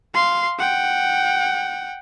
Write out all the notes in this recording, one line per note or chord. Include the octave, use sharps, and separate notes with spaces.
F5 C6
F#5 G5